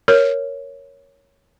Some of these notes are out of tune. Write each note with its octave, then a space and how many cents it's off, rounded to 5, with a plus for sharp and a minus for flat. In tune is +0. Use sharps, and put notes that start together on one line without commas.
A#4 +5 C#5 +0